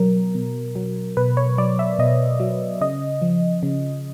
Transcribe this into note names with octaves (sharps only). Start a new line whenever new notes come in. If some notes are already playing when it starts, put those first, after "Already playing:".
Already playing: B2 F#3 A#4
B2
F#3
B2 B4
C#5
F#3 D5
E5
B2 D#5
F#3
C#3 D#5
F3
C#3